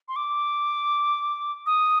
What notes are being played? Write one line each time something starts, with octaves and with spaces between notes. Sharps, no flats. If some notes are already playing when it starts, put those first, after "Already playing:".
C6
D6
D#6